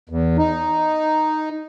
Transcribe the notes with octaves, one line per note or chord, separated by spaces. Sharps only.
E2
D#4